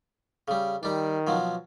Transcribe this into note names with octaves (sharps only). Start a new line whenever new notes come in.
C#3 G3
D#3 G3 D4
B2 F3 F#3